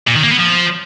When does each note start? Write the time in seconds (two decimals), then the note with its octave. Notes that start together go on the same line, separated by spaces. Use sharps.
0.07 A#2
0.15 D#3
0.23 A#3
0.31 B3
0.39 F3